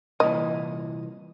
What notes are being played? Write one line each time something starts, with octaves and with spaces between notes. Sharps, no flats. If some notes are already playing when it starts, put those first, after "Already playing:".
C2 A#2 E3 D#5